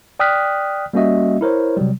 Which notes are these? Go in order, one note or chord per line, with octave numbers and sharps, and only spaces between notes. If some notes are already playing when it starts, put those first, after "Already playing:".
D5 G5 D#6 F6 F#6 B6
G3 A#3 C#4 F#4 D#5 E5
E4 A#4 C5 C#5
C3 F#3 G3